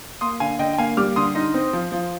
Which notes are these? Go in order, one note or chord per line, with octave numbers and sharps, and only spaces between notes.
A#3 C6 D#6
D3 F5 G#5
D3 D#5 G5
G5
A#3 F5 G#5
G3 D6 F6
D3 C6 D#6
D#4
C4
F3
F3